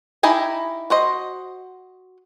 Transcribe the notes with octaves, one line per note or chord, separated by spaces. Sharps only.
D#4 E4 G4 D#5 G#5
F#4 C5 D#5